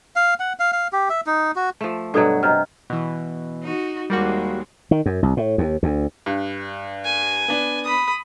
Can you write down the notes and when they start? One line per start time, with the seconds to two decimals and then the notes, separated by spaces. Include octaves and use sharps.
0.16 F5
0.40 F#5
0.59 F5
0.72 F5
0.93 G4
1.09 E5
1.27 D#4
1.56 F#4
1.81 F3 A3
2.14 G2 B2 F#3 A4 D#6 G#6
2.43 C3 D#5 A#5 F6
2.90 B2 E3
3.63 D#4 F#4
4.10 D#2 G3 G#3 A#3 F#4
4.91 D#3
5.06 F#2
5.23 C2
5.37 A2
5.58 D#2
5.83 D2
6.26 G2
7.04 G#5
7.48 B3 D4
7.84 B5 D#6